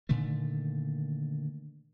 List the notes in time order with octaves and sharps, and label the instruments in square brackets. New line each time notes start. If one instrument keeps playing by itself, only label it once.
[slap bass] A#2 D3 D#3 A3